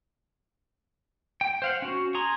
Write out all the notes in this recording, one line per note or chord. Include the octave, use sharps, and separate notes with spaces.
G5
C5 F5 F#5
C#4 F#4
G#4 A#5 C6